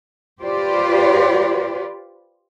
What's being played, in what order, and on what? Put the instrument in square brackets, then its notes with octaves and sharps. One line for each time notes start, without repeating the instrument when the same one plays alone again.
[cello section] F4 G4 B4 C5 D5